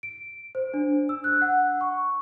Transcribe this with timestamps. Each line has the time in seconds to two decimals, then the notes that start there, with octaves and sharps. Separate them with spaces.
0.03 D7
0.55 C5
0.74 D4
1.09 E6
1.24 F#6
1.41 F#5
1.81 C#6